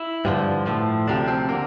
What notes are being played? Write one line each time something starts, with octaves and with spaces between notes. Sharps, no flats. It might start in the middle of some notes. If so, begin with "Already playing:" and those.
Already playing: E4
G2 D3 F3
A2 F3
D2 C3 F3 D4
C4
D3 A#3